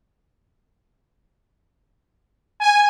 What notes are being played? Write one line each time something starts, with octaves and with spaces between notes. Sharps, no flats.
G#5